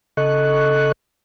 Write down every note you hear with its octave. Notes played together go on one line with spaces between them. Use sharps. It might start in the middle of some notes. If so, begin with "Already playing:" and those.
C#3 A4 D#5 C#6 F#6